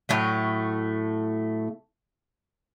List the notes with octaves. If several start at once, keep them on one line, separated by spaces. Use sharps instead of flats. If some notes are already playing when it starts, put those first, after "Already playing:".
A2 F#3 A3